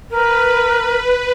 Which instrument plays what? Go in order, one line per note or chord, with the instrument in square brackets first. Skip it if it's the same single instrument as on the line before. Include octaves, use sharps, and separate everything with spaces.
[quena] A#4 [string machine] B4